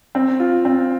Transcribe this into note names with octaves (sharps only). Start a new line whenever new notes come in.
C4
F4
C4